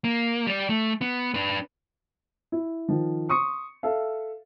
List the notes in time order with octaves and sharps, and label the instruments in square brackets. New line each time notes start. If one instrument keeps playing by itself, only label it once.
[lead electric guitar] A#3
G3 D5
A3
B3
D4 B4
[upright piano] E4
D#3 F3
C6 C#6 D#6 C#7
A4 E5 F5